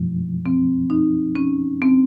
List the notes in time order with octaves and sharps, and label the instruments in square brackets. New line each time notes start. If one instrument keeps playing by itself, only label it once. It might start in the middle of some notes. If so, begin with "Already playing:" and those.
Already playing: [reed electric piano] F3
[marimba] C4
D#4
C#4
C4